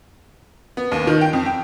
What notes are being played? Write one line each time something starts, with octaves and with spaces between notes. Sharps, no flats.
B3
D#2
D#3
G5
F2
G5